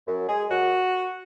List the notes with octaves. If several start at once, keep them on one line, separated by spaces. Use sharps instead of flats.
F#2
G#3 G#4
F#2 F#4